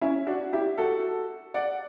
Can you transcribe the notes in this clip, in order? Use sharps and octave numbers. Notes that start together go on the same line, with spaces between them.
C#4 E4
D4 F#4
E4 G4
F#4 A4
D5 F#5